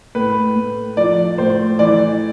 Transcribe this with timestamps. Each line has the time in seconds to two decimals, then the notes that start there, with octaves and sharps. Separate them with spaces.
0.15 A2 B4
0.56 A2
0.97 F3 D5
1.38 A2 C5
1.79 E3 D5